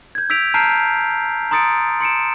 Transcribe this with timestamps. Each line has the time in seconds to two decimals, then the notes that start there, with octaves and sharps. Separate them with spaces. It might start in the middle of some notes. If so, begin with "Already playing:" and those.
0.15 G6 G#6
0.30 E6 G6 B6 D7 F7
0.54 A5 A#5 F6 G6 C7 D7
1.51 A#5 C6 D#6 A6 C#7 D7
2.01 C6 C#7 D7 E7